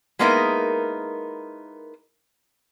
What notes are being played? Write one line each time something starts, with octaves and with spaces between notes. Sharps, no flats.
G#3 A#3 B3 D#4 E4 A#4